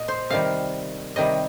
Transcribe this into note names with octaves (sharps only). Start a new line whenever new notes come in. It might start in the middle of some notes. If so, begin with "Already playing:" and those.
Already playing: A#2 D#5
C5
C3 D#3 G3 F5
C3 D#3 G3 D#5